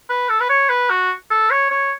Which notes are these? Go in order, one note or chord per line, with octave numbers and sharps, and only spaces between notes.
B4
A4
B4
C#5
B4
F#4
A4
C#5
C#5